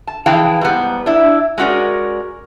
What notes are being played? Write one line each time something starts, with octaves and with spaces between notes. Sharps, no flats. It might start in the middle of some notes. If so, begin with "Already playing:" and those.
A5
F2 E3 G#4 F5 G5 A5
G#2 G3 B3
D4 E4
G#3 C#4 F#4 A#4 D5